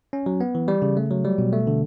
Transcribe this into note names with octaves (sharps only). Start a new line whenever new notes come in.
C#4
F#3
B3
E3
G3
C#3
A3
F#3
G3
B2
A3
D3